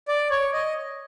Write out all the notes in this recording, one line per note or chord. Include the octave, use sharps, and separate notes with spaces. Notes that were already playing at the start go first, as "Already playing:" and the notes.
D5
C#5
D#5